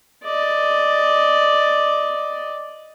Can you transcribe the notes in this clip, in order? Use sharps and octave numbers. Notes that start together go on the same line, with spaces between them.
D5 D#5